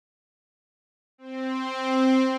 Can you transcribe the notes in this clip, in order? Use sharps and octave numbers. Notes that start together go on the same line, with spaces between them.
C4